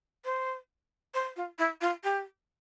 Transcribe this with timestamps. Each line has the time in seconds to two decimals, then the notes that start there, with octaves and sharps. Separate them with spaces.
0.25 C5
1.14 C5
1.36 F4
1.59 E4
1.81 F4
2.04 G4